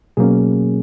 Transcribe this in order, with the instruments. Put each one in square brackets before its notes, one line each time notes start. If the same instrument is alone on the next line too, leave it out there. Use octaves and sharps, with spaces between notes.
[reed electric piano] B2 F#3 A#3 C#4 G#4